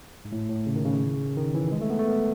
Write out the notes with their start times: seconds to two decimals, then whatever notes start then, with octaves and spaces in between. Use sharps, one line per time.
0.25 G#2
0.32 A2
0.49 A2
0.66 C#3
0.76 D#3
0.85 C#3
1.37 D#3
1.54 E3
1.72 G#3
1.81 A3
1.90 B3
1.99 A3
2.08 B3